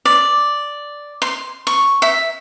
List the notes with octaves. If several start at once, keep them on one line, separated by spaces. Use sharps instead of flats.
D5
C6
C#6
E5